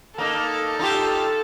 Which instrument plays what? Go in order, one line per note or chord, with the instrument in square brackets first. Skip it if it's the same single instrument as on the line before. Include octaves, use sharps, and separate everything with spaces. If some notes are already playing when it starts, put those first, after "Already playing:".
[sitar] A#3 D#4 [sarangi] A4
[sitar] D#4 F4 G4